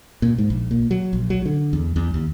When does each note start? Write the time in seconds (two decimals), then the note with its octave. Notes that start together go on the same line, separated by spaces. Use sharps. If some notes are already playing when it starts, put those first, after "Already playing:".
0.22 A#2
0.38 G#2
0.50 A#1
0.71 A#2
0.91 F#3
1.13 A#1
1.30 F#3
1.46 D3
1.73 E2
1.96 E2
2.14 D#2